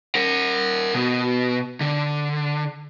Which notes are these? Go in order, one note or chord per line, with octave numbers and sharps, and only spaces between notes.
A#4 F#5
B2
D3